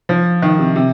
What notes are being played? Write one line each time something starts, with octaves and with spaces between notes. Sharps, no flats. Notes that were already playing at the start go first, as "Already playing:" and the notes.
F3
D#3
C3
C3